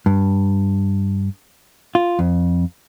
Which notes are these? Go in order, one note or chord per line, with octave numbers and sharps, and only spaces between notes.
G2
F4
F2